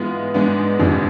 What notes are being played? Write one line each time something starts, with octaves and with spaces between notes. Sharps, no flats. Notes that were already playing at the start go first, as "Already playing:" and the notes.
Already playing: G#2 E3 G#3 B3 F4
G#2 G#3 B3 D4
F1 F2 D3 G#3 D4